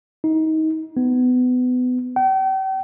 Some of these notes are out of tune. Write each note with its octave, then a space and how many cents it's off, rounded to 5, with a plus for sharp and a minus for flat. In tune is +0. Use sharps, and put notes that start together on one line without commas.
D#4 +25
B3 +25
G5 -40